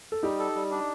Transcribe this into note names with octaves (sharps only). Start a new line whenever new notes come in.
A4
G3 D#4 G4
A4
G3
D4